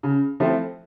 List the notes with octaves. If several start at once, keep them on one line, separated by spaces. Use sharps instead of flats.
C#3
F3 A3 C4 E4